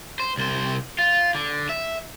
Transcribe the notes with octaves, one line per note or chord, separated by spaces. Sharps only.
C5
C2 C5
F4
D3
E5